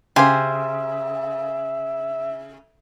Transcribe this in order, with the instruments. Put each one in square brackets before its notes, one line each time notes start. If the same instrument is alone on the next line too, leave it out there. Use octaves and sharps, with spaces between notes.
[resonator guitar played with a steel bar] C#3 [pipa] G4 C5 [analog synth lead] E5 [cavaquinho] G#5 C6